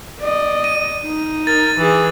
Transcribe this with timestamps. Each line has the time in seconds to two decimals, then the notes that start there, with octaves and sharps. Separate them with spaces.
0.21 D5 D#5
0.64 D#7
1.04 D#4
1.47 A#4 A6
1.78 E3 G#4